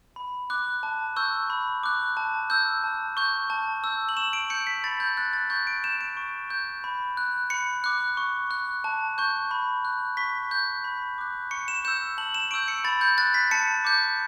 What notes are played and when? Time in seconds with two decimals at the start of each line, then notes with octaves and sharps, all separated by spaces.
0.16 B5
0.50 D6 F#6
0.83 A5
1.16 C#6 E6 G6
1.50 B5
1.83 D6 F#6
2.17 A5
2.50 E6 G6
2.84 A5
3.17 C#6 G6
3.50 A5
3.84 E6 G6
4.09 F#7
4.17 C#6 E7
4.33 D7
4.50 G6 C#7
4.67 B6
4.84 B5 A6
5.00 G6
5.17 F#6 A6
5.33 A6
5.50 C#6 G6
5.67 D7
5.84 G6 E7
6.01 D7
6.17 C#6
6.50 G6
6.84 B5
7.17 F#6
7.50 B5 C#7
7.84 D6 F#6
8.17 C#6
8.51 F#6
8.84 A5
9.18 C#6 G6
9.51 B5
9.85 F#6
10.17 C#6 B6
10.51 G6
10.84 B5
11.18 D6 F#6
11.51 C#6 C#7
11.68 E7
11.85 E6 G6 E7
12.18 A5 F#7
12.34 E7
12.51 C#6 E6 G6 D7
12.68 C#7
12.84 B5 A6
13.01 G6
13.18 F#6 A6
13.34 B6
13.51 A5 C#7
13.85 D6 G6